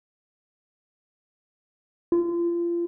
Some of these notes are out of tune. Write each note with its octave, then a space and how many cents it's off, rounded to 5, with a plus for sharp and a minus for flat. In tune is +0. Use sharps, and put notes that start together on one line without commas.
F4 -30